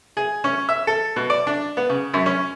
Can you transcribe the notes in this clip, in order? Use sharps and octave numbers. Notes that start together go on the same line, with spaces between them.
G#4
C#4
E5
A4
B2
D5
D4
B3
C#3
F#2
C#4